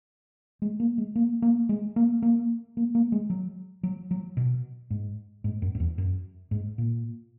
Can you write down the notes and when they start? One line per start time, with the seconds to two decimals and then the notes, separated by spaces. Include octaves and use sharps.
0.62 G#3
0.80 A#3
0.98 G#3
1.15 A#3
1.42 A#3
1.69 G#3
1.96 A#3
2.22 A#3
2.77 A#3
2.95 A#3
3.12 G#3
3.30 F#3
3.83 F#3
4.11 F#3
4.37 B2
4.90 G#2
5.44 G#2
5.62 F#2
5.75 F#2
5.80 E2
5.98 F#2
6.51 G#2
6.78 A#2